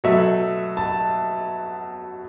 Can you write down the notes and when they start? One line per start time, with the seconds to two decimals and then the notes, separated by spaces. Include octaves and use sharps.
0.04 B2 F#3 A3 E5
0.77 A5